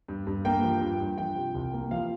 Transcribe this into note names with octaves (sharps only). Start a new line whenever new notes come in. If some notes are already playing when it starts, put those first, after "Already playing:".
G2
G2
A#3 G5
F3
G2
G2
F3 G5
C3
C2
A#3
F3 F5